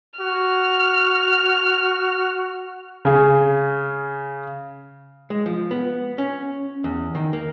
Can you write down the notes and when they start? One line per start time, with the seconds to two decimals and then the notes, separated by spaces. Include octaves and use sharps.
0.20 F#4 F6
3.05 C#3 G#4
5.30 G#3
5.46 F3
5.71 B3
6.18 C#4
6.84 E2
7.15 D#3
7.33 A#3